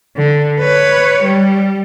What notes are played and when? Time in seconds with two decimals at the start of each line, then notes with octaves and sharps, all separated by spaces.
0.17 D3
0.60 B4 C#5
1.24 G3